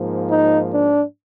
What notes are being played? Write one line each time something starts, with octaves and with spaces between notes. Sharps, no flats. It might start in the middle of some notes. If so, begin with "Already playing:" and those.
Already playing: G#2 F3 A#3
D#4
D4